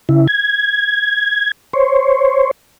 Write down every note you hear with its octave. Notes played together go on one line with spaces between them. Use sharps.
C#3 E4
G#6
C5 C#5